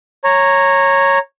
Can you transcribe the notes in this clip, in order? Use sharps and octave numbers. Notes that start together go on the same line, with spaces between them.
C#5 A#5